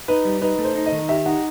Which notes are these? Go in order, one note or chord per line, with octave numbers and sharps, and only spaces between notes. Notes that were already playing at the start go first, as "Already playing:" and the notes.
D#4 B4
G3
D#4 B4
A3
C5
D#4
D#5
D#3
G4 E5
D#4 F#5